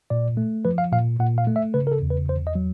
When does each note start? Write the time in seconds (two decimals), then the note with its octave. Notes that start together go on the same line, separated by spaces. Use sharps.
0.10 A#2 D5
0.37 A3
0.65 F3 B4
0.78 F5
0.92 A#2 F5
1.19 A#2 F#5
1.38 F5
1.47 A3
1.56 E5
1.74 C#3 B4
1.87 A#4
1.92 A4
2.02 E2
2.10 B4
2.28 E2 C5
2.47 D#5
2.55 F#3